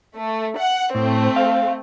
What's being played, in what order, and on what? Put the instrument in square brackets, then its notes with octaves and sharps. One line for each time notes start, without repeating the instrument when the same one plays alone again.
[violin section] A3
F#5
[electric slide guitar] A2 [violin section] A3 C4
[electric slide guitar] F5